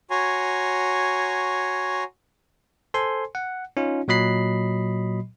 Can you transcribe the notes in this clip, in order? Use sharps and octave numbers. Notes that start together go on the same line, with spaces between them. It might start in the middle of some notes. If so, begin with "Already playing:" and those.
F#4 C#5 G#5 A#5 C6
A4 C5 G#5 C6
F#5
C#4 D#4 F4
A#2 F#3 D#5 B5 C7